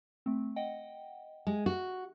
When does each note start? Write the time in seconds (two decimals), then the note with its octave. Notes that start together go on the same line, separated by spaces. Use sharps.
0.26 A3 C4
0.56 D#5 F#5 G5
1.47 G#3
1.66 F#4